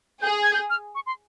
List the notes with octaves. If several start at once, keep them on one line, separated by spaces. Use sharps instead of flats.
G#4 G6
G#6
G6
F6
C#6
C6